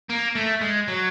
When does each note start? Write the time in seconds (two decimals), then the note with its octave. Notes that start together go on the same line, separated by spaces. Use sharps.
0.09 A#3
0.35 A3
0.61 G#3
0.88 F#3